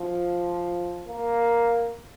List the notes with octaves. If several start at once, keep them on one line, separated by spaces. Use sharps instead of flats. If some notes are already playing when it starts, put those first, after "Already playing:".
Already playing: F3
A#3